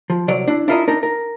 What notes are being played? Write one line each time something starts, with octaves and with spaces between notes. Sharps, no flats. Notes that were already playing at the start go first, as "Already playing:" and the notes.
F3
C2 F#3 C#5 D5
D4 E4
D4 E4 F4 A#4 D5 D#5
D4 D#4 A#4
A#4